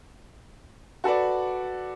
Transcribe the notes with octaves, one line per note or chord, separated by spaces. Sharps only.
F#4 A4 B4 D5